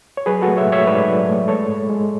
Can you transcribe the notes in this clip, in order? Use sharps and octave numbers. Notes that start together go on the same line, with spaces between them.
C#5
F#3 G#4 B4
F#4 A4
A3
C#5 E5
G#2
C#5 E5
G#2 B4 D5
F#3
A3
G#3 A4 C#5
G#2
G#3